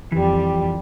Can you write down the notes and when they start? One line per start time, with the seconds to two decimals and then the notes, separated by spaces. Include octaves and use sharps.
0.12 F2 E3 F3 G3 G4